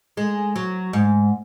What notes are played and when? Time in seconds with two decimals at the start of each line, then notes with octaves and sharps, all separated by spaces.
0.17 G#3
0.56 F#3
0.93 G#2